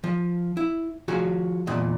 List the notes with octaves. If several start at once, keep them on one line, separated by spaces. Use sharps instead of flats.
F3
E4
F3 F#4 G#4
E2 A#2 D#5